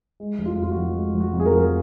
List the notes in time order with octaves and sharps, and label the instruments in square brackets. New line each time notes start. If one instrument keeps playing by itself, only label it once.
[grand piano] G#3
F1
F4
F2 F4
F#4
F3
G#3
F1
F#4
F2
G#4
A#4
F3